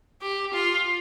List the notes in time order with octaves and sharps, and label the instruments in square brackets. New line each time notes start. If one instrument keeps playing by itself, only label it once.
[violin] G4
F4